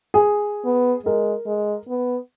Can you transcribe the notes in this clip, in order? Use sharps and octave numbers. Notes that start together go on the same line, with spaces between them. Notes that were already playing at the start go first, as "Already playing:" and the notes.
G#4
B3
G#3 A#4
G#3
B3